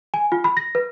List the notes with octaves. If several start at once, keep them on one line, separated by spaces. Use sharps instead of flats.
G#5
F4
B5
A#6
B4